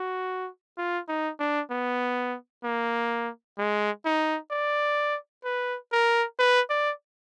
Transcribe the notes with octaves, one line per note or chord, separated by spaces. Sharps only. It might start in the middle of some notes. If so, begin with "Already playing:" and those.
Already playing: F#4
F4
D#4
D4
B3
A#3
G#3
D#4
D5
B4
A#4
B4
D5